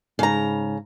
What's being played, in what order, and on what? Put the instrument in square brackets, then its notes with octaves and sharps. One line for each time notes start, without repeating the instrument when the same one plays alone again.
[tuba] G#2 [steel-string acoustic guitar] C#3 A#5